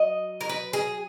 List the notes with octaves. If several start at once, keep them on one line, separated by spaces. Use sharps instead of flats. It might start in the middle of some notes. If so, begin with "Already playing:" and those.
Already playing: F#3 D#5
A#4
B4
G#4